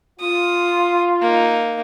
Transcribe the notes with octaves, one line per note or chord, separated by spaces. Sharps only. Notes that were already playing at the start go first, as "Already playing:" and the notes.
F4 D#6
A#3 D#4